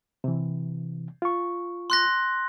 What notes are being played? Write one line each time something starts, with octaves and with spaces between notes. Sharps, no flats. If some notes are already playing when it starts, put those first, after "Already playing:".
C3 E3
F4 C#6
C6 F#6 A#6